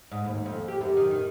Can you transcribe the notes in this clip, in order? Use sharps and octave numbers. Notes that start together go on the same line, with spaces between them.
G#2
D#2
F2
G4
F#2
D#3
D#3